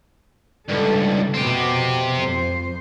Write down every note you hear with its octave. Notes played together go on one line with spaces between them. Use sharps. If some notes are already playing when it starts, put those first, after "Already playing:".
C#2 G2 A4
F2 B2 C4 G4
F2 C5